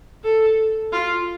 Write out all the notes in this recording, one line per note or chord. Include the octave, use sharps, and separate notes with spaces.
A4
F4